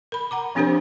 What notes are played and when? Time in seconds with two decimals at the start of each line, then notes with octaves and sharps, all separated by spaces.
0.12 A#4 B5
0.31 F#5 A#5 D6
0.55 F3 C4 D4 G4 A#4 C5